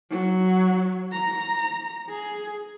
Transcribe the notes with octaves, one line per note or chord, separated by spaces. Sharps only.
F#3
A#5
G#4